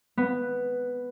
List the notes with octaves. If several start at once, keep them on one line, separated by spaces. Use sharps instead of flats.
B3